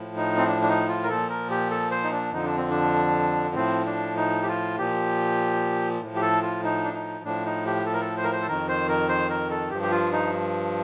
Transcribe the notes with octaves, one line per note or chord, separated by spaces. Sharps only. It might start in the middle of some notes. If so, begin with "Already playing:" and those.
Already playing: A2 F3
D#4
C4
D4
D4
D#4
F4
A#4
A#2 F3 A4
A#4
G4
A4
C5
D#4
D4
F2 D3 F3 D#4
D4
C4
D4
A2 F3 C4
D4
D#4
G4
F4
A#2 F3 G4
A2 F3
G4
A4
F4
D#4
D4
D#4
A2 F3 D4
D#4
G4
A4
A#4
A4
C5
A#4
C5
A4
F2 D#3 A#4
C5
A#4
C5
A#4
A4
G2 F3 G4
G4
F4
D#4